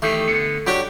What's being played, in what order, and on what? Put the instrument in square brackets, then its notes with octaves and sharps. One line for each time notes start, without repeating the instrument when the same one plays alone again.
[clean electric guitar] D#3 E3 G4 [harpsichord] A3
[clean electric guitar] D3 B3
[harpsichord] F#3 D4 F#4 [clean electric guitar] G4